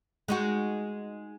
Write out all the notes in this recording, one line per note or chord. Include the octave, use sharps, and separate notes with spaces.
G#3 D#4 F#4